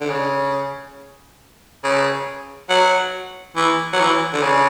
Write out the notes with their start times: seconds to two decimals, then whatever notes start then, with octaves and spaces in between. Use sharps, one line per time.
0.01 D3
0.10 C#3
1.84 C#3
2.69 F#3
3.56 E3
3.93 F#3
4.00 E3
4.33 D3
4.42 C#3